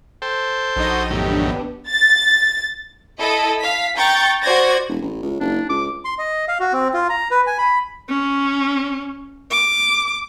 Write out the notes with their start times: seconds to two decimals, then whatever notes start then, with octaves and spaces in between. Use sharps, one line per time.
0.22 A4 C5 G5
0.76 A#1 D#4 F#4 D#5
1.10 F#2 A2 D#3 B3 D4 G4
1.90 A6
3.20 E4 A4 D#5
3.60 F5 B6
3.96 G5 A#5 C#6 G6 A6
4.42 F#4 C5 D5 G#6 A#6
4.89 E1
5.01 A1
5.23 C#2
5.40 F#1 D4
5.69 C#2 D6
6.05 C6
6.18 D#5
6.48 F5
6.60 F#4
6.73 C4
6.94 F4
7.09 A#5
7.31 B4
7.47 G#5
7.58 B5
8.09 C#4
9.51 D6